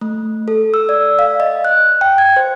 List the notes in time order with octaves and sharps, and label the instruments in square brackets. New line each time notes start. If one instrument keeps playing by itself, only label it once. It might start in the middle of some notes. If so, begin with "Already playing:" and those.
[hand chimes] A3
A4
E6
D5
F5
D#5
F#6
G5
G#6
C5